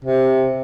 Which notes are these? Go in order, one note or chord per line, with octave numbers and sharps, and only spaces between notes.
C3